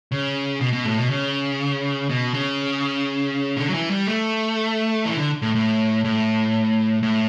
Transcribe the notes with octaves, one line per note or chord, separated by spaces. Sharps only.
C#3
B2
B2
A2
B2
C#3
B2
C#3
D3
F#3
E3
G3
A3
E3
D3
A2
A2
A2
A2